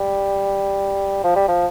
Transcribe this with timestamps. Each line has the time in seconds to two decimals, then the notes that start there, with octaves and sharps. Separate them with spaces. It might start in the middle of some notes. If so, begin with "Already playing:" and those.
Already playing: G3
1.24 F3
1.35 G3
1.48 F3